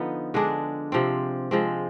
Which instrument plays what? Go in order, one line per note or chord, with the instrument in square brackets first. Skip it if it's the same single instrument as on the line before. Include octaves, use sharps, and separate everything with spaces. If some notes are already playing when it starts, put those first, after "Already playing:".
Already playing: [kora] D3 F3 B3 D#4
D3 G#3 D4 G#4
C3 F3 C4
F3 G#3 C4